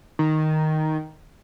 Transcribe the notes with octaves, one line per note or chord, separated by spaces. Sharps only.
D#3